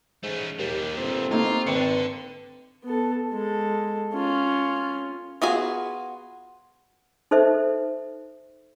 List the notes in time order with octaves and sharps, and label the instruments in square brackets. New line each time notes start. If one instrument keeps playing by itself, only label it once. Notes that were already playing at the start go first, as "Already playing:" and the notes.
[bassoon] G#2 [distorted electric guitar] A3 C#4
[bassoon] D#2 [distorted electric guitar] A#2 G3 [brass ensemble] G4
[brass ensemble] G1 [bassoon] C4
[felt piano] A3 A#3 D#4 [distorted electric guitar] F4
[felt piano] G#1 C#7 [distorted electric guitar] D3 [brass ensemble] B4 G5
[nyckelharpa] B3 A4
G#3 A4
C#4 F4
[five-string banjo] B3 F4 F#4 G#4
[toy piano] D#4 A4 C5 D5 E5